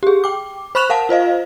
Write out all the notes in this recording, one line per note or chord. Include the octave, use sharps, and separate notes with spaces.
G4 G#4
G5 D6
C5 B5 C#6 F#6 E7 F7
A#4 F5 F#5 A5
F4 C5 D#5 F5